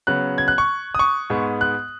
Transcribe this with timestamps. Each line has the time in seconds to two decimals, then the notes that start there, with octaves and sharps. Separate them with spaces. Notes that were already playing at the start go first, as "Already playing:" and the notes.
0.07 C#3 F#3 B3 F#6
0.38 G#6
0.48 F#6
0.58 C#6
0.95 D#6
0.99 C#6
1.30 G#2 G#3 B3
1.61 F#6